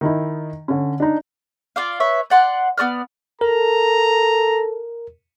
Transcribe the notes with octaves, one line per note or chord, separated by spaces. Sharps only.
D#3 D#4 E4
D3 C#4
D4 D#4
F4 D5 F5
B4 C#5 E5
D5 F#5 C6
B3 F#4 D5 F6
A4 A#4 A#5